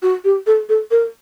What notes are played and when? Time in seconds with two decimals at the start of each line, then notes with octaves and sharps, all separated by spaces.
0.02 F#4
0.24 G4
0.47 A4
0.69 A4
0.91 A#4